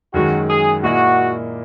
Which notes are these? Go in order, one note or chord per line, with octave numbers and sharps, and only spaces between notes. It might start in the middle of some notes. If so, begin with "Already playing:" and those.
F#2 D#3 G#3 F#4
G#4
A#2 A#3 E4 F#4 G#4 D#5